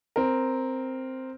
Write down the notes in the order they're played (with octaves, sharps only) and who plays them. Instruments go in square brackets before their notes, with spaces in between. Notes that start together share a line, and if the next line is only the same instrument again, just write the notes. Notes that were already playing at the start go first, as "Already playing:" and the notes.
[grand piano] C4 A#4